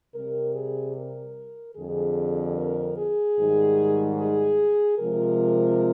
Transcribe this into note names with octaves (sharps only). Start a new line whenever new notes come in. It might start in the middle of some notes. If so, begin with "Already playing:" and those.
C3 G3 A#4
G#4
A#4
F2 D3 G3 G#4
A#4
G#4
G#2 D#3 G3
G#4
C3 F3 G#3 A#4